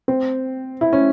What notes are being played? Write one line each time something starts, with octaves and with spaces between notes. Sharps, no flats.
C4
E4
C#4